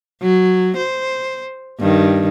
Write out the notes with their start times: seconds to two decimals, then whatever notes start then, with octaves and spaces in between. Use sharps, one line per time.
0.22 F#3
0.77 C5
1.80 G2 D#3